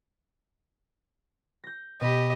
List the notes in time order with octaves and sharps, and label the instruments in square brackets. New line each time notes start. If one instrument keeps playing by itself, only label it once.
[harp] G6 A#6
[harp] B2 B5 [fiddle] G4 D#5